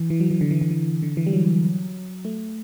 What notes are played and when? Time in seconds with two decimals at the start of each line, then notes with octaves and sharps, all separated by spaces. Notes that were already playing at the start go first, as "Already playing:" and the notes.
Already playing: E3
0.10 E3
0.20 F#3
0.31 E3
0.41 D3
0.51 E3
0.61 D3
0.71 E3
1.02 D3
1.17 E3
1.27 G3
1.33 F#3
2.25 A3